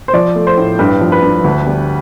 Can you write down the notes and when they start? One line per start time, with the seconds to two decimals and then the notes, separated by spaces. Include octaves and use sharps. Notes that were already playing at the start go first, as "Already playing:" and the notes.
0.08 C5
0.13 F3 D5
0.35 A3
0.47 C5
0.57 A2
0.79 G2 B4
1.01 F3
1.12 B4
1.23 G2
1.44 D2
1.67 G3